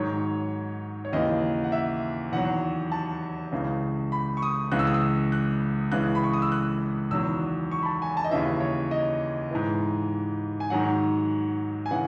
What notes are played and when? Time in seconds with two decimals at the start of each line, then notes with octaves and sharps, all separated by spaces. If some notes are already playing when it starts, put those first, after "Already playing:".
Already playing: G#2 D#3 F#3 C#5
1.05 C#5
1.13 D#2 C#3 E3 D#5
1.64 F#5
1.72 E5
2.32 E2 D#3 F#3 F#5
2.92 A5
3.52 C#2 C#3 E3
4.12 B5
4.37 C#6
4.43 D#6
4.72 C#2 C#3 E3 F#6
4.79 E6
4.87 D#6
4.94 E6
5.32 F#6
5.92 C#2 C#3 E3 F#6
6.15 B5
6.24 C#6
6.33 D#6
6.42 E6
6.52 F#6
7.11 E2 D#3 F#3 E6
7.71 C#6
7.82 B5
7.86 A5
8.02 G#5
8.17 A5
8.24 D#5
8.31 D#2 C#3 E3 E5
8.61 C#5
8.91 D#5
9.51 G#2 E3
10.60 G#5
10.70 G#2 D#3 F#3 F#5
11.86 G#5
11.91 C#3 E3 F#5